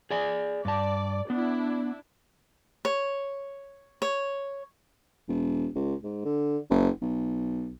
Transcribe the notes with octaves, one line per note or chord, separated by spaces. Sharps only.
G#4 D5 G#5
G2 D5 A5
B3 D4 E4
C#5
C#5
E1
C#2
G#2
D3
F#1
B1